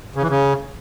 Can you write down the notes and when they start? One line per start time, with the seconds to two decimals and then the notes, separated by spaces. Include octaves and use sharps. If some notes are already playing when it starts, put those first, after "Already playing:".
0.16 C#3
0.23 E3
0.30 C#3